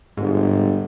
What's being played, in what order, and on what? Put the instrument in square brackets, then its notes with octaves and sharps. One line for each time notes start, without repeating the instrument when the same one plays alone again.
[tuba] G1 [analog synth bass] G#2